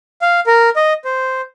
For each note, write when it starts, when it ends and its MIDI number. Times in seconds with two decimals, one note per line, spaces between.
0.22 0.40 77
0.47 0.70 70
0.76 0.93 75
1.05 1.41 72